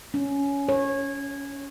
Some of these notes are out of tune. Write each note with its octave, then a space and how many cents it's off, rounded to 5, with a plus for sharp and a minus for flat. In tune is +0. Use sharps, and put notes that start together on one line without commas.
C#4 +15
C#5 -20